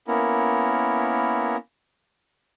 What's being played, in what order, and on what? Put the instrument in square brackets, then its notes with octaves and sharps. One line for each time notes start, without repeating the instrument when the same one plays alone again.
[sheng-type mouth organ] A#3 B3 C#4 E4 A#4